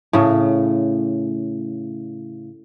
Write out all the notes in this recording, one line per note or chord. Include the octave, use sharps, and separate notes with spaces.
A2 C#3